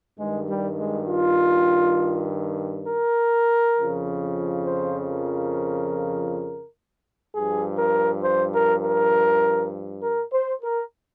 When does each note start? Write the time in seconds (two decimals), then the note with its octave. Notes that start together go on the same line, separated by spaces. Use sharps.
0.18 G2 D#3 G#3
0.48 G3
0.78 G#3
1.08 F4
2.86 A#4
3.76 F2 C#3 F3
4.66 C5
5.10 A#4
7.34 G2 F3 G#4
7.79 A#4
8.23 C5
8.53 A#4
8.83 A#4
10.02 A#4
10.32 C5
10.62 A#4